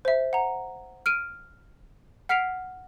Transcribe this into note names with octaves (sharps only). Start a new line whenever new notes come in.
C5 E5
F#5 A#5
F6 D7 D#7
F#5 F6 B6 C7 D7 F7